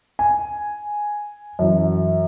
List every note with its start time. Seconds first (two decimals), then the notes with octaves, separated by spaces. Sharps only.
0.19 G#5
1.59 F#2 E3